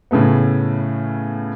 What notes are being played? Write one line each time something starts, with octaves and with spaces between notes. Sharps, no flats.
A2 C#3 A3 B3